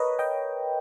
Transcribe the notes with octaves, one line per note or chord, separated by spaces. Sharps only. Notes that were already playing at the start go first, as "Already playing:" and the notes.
Already playing: A#4 B4 C#5 D#5
D#5 G5